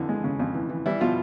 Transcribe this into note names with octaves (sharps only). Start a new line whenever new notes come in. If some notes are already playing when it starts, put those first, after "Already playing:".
Already playing: F2 D3 E3
G#3
C#3
F2
E3
E3
E3 G3 E4
B2 F3 F4